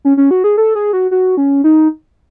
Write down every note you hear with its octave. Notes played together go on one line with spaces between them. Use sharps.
C#4
C#4
F#4
G#4
A4
G#4
F#4
F#4
C#4
D#4